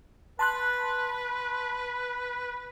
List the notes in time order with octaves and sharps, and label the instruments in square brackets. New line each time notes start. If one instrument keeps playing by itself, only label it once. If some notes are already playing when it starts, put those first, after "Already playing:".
[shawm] B4 [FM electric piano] A5 C6 F#6